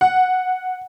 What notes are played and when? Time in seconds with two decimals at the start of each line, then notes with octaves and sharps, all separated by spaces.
0.01 F#5